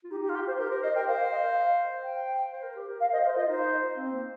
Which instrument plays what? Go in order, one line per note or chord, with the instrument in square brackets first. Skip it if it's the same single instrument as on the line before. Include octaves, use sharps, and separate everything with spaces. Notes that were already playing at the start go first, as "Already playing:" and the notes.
[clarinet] F4
[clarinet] D#4 [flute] G4
[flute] G4
F4
G4
C5
[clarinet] G4 [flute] A#4
[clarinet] A#4 [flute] C5
[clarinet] C5 [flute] D#5
[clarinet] A#4 [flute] G5
[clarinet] C5 [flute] F5
[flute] F5
D#5
F5
G5
[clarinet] C5
A#4
G4
A#4
[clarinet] A#4 [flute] F5
[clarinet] C5 [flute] D#5
[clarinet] A#4 [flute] C5
[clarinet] F4 [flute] D#5
[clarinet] D#4 [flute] C5
[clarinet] C4
A#3